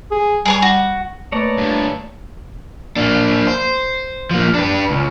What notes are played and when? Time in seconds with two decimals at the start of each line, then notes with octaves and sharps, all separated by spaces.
0.11 G#4
0.45 G3 G#4 B4 C#5
0.62 F#4
1.32 A3 A#3 B4 C#5 D5 A5 A#5
1.57 G2 D3
2.96 A#3 D4
3.47 C5
4.31 F3 A#3
4.54 D4 B4
4.90 C#2